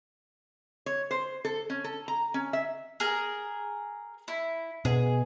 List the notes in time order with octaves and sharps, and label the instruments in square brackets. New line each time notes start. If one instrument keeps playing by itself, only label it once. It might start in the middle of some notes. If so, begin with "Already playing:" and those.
[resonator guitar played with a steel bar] C#5
C5
A4
C#4
A4
A#5
C#4
E5
[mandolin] G#4 A#4
E4
[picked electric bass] B2 [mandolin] G#4